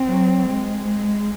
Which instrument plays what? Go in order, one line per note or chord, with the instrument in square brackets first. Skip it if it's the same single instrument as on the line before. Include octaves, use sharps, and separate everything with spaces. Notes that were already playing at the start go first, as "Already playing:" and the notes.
Already playing: [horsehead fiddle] C4
[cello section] F#3
G#3